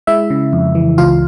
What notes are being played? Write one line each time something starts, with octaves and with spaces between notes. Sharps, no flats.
G#3 E4 E5
C#3
F2
E3
C#2 F4 F5